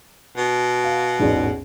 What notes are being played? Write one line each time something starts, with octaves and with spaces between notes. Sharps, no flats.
B2
F5
A1 E2 G#2